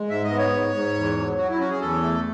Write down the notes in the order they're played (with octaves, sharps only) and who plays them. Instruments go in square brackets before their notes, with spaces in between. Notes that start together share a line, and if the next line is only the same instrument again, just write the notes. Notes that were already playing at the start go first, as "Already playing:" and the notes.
Already playing: [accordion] G#3
G#2 E5
D#5
B3
C#5
G#2
G#2
E2
F#3
F#3 F#4
E4
C#4 F#4
G#4
E2 A4
A3